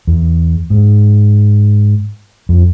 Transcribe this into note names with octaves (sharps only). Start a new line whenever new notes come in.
E2
G#2
F2